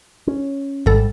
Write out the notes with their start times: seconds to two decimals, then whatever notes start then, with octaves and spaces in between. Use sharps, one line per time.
0.27 C#4
0.86 G#1 G#2 G3 A4